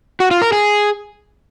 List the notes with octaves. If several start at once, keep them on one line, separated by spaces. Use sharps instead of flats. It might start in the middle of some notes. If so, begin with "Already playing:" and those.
F#4
F4
A#4
G#4